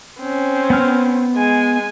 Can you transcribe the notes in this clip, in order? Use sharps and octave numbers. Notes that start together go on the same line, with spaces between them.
C4 C#4
B3 F6
G#3 G#5